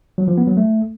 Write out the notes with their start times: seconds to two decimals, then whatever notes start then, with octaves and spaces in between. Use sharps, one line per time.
0.18 F#3
0.28 F3
0.38 B3
0.47 F#3
0.57 A3